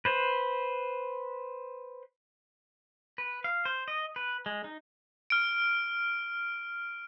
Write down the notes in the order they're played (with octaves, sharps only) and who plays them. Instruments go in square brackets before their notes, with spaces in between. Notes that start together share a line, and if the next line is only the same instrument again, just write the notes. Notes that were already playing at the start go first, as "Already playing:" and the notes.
[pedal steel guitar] B4 C5
B4
F5
C5
D#5
B4
G#3
D#4
[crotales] F6 D7